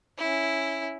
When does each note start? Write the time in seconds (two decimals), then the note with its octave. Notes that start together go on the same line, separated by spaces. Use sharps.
0.18 C#4 E4